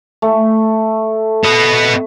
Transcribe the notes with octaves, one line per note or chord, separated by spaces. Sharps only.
A3
B3 D#5